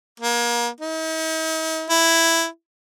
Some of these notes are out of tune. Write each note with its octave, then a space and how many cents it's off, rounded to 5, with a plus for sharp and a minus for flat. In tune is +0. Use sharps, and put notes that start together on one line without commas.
A#3 +35
D#4 +45
E4 +5